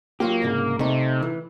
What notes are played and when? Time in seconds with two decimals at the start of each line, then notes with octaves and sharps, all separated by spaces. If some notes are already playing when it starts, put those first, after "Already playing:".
0.20 F#3 A#3 F4 G4
0.42 C2 G#2 C#3
0.79 C3 A3 D#4
1.22 E3